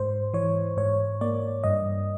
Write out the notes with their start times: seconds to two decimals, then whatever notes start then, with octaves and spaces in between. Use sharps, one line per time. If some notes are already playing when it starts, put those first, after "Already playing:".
Already playing: G#2 C5
0.34 E3 C#5
0.77 G#2 C#5
1.21 A#3 D5
1.64 G2 D#5